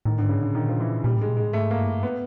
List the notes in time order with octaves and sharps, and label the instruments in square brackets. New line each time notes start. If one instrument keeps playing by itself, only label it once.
[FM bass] A2 [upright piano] D#3
[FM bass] G#2 [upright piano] D3
[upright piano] C#3
[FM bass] A2 [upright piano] D3
[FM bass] A#2 [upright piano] D#3
[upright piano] F3
E3
[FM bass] A#2 [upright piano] G3
[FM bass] A2
[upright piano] G#3
[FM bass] A#2
[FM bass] A2 [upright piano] G#3
[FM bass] G#2 [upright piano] A3
[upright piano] A#3
[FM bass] G2
[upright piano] B3